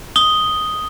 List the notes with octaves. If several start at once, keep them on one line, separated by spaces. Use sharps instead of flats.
D#6 G7